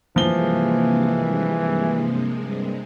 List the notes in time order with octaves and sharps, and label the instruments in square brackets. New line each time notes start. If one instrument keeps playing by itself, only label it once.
[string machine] G2 C3 G#3 [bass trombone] E3 [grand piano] F3 G7 [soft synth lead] A#3